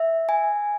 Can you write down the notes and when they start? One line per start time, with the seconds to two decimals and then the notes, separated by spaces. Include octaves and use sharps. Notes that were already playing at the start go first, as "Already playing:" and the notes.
Already playing: E5
0.29 G#5